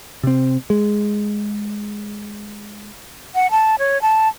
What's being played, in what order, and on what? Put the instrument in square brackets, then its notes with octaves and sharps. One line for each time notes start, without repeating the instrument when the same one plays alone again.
[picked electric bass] C3 C4
G#3
[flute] F#5
A5
C#5
A5